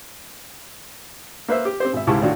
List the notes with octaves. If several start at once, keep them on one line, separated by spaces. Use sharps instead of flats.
A#3 B4 C5 E5
G4
C4 G4 C5
G#1 E5
C#2 G#2 E4 G4 A5 C#6
A2 D#3 D4 F4 F#4